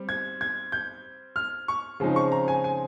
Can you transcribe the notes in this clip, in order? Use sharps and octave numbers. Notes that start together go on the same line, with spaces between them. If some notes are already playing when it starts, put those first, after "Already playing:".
Already playing: G3 C4
G#6
G#6
G6
F6
C#6
C#3 F3 G#3 C4 D#4
C#6
A#5
G#5
G#5